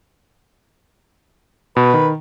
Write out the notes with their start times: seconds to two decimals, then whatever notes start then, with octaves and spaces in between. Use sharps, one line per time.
1.76 B2 B4
1.94 D#3